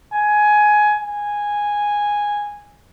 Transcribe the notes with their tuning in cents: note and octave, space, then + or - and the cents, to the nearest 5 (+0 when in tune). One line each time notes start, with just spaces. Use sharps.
G#5 +15
G#5 -5